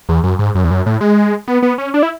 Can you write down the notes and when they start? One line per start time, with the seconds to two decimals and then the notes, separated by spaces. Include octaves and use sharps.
0.09 E2
0.24 F#2
0.39 G#2
0.55 F#2
0.64 E2
0.71 F#2
0.86 A2
1.01 G#3
1.47 B3
1.62 B3
1.78 C#4
1.94 D4
2.03 E4